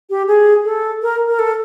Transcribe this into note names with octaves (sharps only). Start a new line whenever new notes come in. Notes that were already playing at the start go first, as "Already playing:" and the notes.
G4
G#4
A4
A#4
A#4
A4